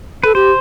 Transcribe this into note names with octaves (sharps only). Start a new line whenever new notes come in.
A4 B4
G4 C5